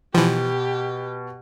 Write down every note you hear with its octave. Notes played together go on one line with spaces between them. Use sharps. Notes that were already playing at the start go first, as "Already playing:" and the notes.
B2 E3 F3 G4